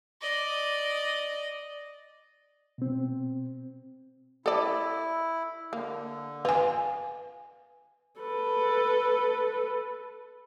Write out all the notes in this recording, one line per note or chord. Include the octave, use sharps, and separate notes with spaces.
D5 D#5
B2 C4
E4 A4 D5
D3 A#3
F4 B4 G#5
A4 B4